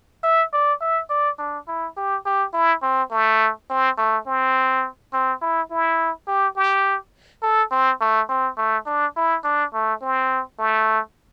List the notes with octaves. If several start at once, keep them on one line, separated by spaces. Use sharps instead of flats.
E5
D5
E5
D5
D4
E4
G4
G4
E4
C4
A3
C4
A3
C4
C4
E4
E4
G4
G4
A4
C4
A3
C4
A3
D4
E4
D4
A3
C4
A3